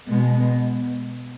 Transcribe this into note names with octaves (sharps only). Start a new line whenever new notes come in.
B2 G#3 B3